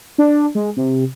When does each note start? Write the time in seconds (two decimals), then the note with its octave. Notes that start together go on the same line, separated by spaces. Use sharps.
0.18 D4
0.55 G#3
0.77 C3